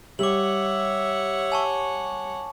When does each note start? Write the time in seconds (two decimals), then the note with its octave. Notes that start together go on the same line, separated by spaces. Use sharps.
0.19 G3 C#5 E5 F#5 D6 F#7
1.52 G#5 A5 C#6